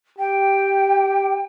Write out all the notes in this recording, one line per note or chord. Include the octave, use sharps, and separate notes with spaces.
G4 G5